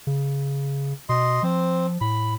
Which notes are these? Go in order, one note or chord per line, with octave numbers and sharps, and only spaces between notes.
C#3
B2 D#5 C6
F3 C4
A2 B5